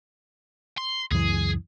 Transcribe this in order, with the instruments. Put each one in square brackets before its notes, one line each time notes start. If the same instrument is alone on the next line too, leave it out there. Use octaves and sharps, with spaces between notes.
[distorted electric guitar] C6
[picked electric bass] C#2 F#2 E3 [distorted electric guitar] G#4